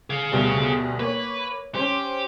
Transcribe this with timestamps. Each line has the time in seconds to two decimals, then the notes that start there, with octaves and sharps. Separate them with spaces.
0.10 G#4 F5
0.32 D2 B2 G3
1.00 A#3 B4 C#5
1.75 C#4 G4 C5